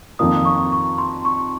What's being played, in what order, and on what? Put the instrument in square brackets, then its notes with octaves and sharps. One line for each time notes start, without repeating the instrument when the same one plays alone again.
[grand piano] F2 D#3 A#3 F4 [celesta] D#6
[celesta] C#6
C#6
C6
C#6